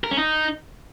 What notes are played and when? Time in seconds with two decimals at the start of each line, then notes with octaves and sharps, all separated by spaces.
0.04 A#4
0.11 C#4
0.18 D#4